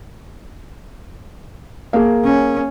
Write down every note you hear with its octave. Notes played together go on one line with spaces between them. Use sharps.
A#3 G#4
C#4